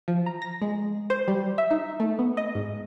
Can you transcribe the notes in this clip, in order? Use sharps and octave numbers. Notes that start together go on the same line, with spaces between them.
F3
A#5
A#6
G#3
C5
G3
E5
D#4
A3
B3
D#5
G#2